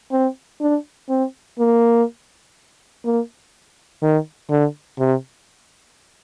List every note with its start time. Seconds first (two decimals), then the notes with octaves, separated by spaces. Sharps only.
0.12 C4
0.61 D4
1.09 C4
1.59 A#3
3.05 A#3
4.03 D#3
4.50 D3
4.99 C3